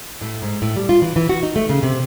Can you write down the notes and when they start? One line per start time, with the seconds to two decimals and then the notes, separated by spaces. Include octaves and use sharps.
0.21 A2
0.42 G#2
0.62 A2
0.76 G3
0.89 F4
1.02 E3
1.16 E3
1.29 F#4
1.43 D#4
1.56 A3
1.69 C#3
1.83 C3